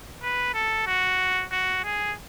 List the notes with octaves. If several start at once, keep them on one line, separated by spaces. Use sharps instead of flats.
B4
A4
F#4
F#4
G#4